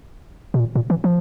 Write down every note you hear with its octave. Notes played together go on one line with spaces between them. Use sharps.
B2
A#2
A#2
E3
F3